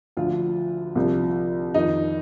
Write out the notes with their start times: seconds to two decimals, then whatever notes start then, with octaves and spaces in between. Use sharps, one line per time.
0.17 D2 D3 F3 F4
0.95 C2 C3 F3
1.74 F2 D#3 D#4